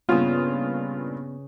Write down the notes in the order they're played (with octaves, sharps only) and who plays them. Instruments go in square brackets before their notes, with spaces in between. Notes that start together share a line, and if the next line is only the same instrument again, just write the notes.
[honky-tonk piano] G2 A#2 D#6 [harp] C#3 C#4 [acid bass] B3 [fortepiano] F4